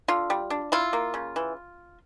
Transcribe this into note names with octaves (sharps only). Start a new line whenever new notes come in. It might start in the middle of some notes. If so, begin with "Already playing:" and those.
D3 F4
G3
D4
E4 F4
A#3
C#3
E3